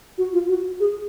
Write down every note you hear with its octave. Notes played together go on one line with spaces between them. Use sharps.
F#4
F4
F#4
G#4